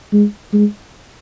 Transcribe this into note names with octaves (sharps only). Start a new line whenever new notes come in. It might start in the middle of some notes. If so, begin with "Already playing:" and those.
G#3
G#3